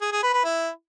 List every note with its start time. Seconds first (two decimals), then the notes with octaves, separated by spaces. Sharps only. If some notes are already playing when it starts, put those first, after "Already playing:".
0.01 G#4
0.12 G#4
0.23 B4
0.34 B4
0.44 E4